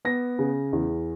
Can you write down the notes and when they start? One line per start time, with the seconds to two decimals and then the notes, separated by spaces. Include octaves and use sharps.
0.05 B3 A#6
0.39 C#3
0.73 E2